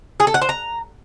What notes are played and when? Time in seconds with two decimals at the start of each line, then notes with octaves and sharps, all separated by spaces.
0.20 G#4
0.27 A4
0.34 F#5
0.42 C5
0.49 A#5